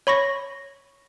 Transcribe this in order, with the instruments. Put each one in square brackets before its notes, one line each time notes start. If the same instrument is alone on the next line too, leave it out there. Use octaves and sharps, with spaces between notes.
[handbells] C#5 B5 C#6 A#6